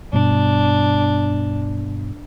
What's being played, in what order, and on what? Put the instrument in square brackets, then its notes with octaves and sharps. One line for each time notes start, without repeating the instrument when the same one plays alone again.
[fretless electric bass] G2 B2 [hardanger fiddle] D4